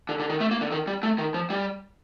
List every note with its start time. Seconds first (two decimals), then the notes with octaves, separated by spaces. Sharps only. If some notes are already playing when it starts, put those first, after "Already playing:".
0.09 D3
0.20 D3
0.30 D#3
0.40 A3
0.51 A#3
0.61 D3
0.72 D#3
0.87 G3
1.03 A3
1.18 D#3
1.34 F3
1.50 G3